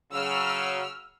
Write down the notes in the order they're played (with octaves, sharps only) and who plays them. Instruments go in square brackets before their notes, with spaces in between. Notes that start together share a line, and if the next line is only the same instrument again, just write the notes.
[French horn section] C#3 F#3 [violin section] E6 F6